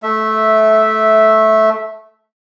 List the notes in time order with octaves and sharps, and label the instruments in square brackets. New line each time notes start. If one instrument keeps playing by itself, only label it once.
[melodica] A3 E5